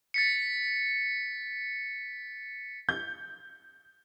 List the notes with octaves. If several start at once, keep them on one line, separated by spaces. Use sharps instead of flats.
A6 B6 C#7
G6